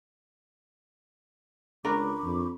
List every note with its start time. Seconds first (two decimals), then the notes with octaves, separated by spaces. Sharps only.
1.85 C#2 D4 A#4 B5 C#6 D6
2.24 F2